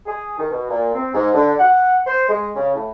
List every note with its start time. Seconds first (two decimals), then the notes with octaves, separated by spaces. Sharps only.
0.06 G#4
0.39 D#3
0.51 B2
0.70 A#2
0.95 C4
1.14 G#2
1.34 D3
1.59 F#5
2.07 C5
2.29 G#3
2.55 C#3
2.75 A2